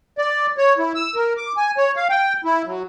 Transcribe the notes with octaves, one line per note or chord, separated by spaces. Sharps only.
D5
C#5
E4
E6
A#4
D6
G#5
C#5
F5
G5
E4
F#3